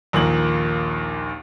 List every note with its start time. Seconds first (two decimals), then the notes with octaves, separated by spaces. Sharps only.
0.13 A#1 D#2 A#3 F#7